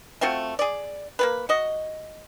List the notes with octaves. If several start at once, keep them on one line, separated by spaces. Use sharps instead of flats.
A3 C4 F4 F#4
G#4 D5
A#3 B3 B4
F#4 D#5